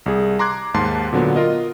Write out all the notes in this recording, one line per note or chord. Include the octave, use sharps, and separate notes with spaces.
C2 G#4
A#5 C6 D6 F#6 G#6
D#2 G#2 A5 C6
A#2 D3 F#3 B3 D4
F4 A#4 D#5